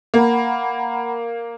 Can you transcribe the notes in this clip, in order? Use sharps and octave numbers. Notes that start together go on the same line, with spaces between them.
A#3 F#5 A#5 B5